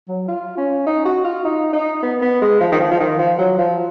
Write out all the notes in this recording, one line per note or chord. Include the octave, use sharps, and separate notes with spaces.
F#3
F4
C#4
D#4
F#4
F4
D#4
D#4
B3
B3
G#3
F3
D#3
F3
F3
D#3
F3
F#3
F3